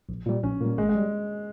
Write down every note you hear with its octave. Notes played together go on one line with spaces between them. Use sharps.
A#1
A#2 G3
A#1 C#4
A#2 G3 A#3
G#1 G#3
G#3
G3